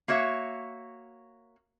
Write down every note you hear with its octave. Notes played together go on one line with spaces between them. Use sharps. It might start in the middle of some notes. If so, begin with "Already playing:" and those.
A#3 F#4 C#5 E5